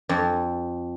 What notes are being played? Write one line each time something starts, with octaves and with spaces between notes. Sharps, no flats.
F2